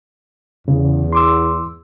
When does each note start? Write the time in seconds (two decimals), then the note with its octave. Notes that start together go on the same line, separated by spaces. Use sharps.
0.68 E2 C#3
1.13 C6 D6 E6